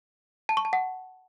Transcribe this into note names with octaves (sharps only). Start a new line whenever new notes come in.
A5
C#6
A5
F#5